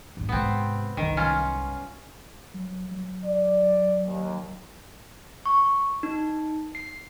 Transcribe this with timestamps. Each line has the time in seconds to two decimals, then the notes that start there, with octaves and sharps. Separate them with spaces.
0.17 G#1 F2
0.29 G#2 C3 B3 C4
0.97 C2 F#2 D#3
1.17 C#4 F4
2.54 F#3
2.91 F#3
3.25 D5
4.05 D#2
5.46 C#6
6.03 D#4
6.75 C7